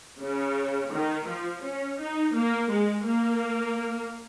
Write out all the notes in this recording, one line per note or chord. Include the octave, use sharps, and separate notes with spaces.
C#3
D#3
F3
C#4
D#4
A#3
G#3
A#3